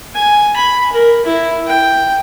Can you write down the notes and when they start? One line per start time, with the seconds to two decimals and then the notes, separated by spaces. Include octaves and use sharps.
0.15 G#5
0.56 B5
0.93 A#4
1.25 E4
1.67 G5